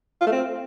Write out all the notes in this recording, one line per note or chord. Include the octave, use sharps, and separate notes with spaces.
F4
A3
C4